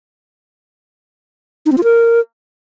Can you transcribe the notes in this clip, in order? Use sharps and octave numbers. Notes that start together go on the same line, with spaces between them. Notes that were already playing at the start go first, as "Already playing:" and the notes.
D#4
C4
F4
A#4